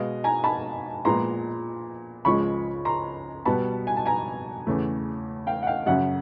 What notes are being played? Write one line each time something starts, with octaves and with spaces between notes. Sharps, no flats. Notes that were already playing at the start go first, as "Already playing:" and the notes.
Already playing: B2 G#3 B3 D#5 F5
G#5 A#5
A5 B5
A#2 F3 G#3 B3 A#5 C6
C#2 C#3 F3 G#3 B5 C#6
A#5 C6
B2 G3 B3 A5 B5
G#5
A5
G#5 A#5
E2 C#3 E3 A3
F5 G5
F#5
F5 G5
F#2 C#3 F#3 E5 F#5